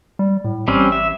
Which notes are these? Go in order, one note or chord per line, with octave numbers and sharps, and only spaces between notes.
G3
A2
A1 G3 C4 C#4
E5